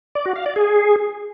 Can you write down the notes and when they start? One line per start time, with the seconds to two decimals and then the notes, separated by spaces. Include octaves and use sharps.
0.15 D5
0.25 F#4
0.36 F5
0.46 D5
0.56 G#4